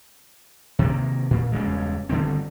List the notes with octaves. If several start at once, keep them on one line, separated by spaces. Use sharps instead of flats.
C3 D#3 A#3
A#2
E1 G2 C#3 G#3
G1 D3 D#3 C4